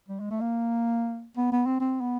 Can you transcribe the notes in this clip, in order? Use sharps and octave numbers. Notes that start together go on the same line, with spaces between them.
G3
G#3
A3
A#3
B3
B3
C4
C4
B3